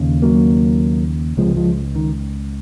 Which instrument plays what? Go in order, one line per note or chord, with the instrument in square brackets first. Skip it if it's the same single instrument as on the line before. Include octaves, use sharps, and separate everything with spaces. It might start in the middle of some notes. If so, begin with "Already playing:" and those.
Already playing: [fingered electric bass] D#2 C#3
F#3 A#3
C#2 C3 F3 G#3
F3 G#3
D#3